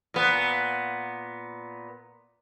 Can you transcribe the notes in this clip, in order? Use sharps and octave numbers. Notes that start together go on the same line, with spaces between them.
A#2 B3